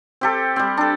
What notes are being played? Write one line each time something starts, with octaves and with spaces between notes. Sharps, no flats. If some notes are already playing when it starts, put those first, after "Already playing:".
C4 G4 A4
G3 C4
D4 A4